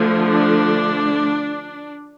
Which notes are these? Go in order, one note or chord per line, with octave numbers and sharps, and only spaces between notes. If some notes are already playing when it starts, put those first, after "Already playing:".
Already playing: D3 F3 A3
D4